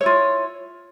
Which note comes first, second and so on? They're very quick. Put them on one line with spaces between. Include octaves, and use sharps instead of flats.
C#5 E4 F4